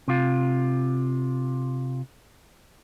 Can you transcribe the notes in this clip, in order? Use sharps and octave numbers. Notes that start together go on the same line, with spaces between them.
C3 F4